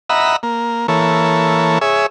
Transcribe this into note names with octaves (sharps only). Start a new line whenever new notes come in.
D#5 E5 F#5 A#5 B5
A#3
E3 A#3 A4 C#5
G#4 C#5 E5